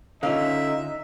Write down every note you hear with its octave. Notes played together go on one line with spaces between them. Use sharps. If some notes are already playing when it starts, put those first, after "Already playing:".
D3 C#4 D#4 F4 E5 F5